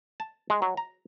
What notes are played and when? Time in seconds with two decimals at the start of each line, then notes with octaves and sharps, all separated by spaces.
0.20 A5
0.50 G#3
0.62 F#3
0.77 A#5